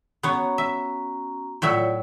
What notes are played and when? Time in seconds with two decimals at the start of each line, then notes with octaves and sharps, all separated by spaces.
0.23 B3 C#4 F#4 C#5 A#5
0.58 E5
1.62 A2 F#3 F4 C#5 D5 E5